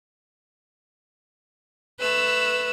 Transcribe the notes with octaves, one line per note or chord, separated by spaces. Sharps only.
A3 B4 E6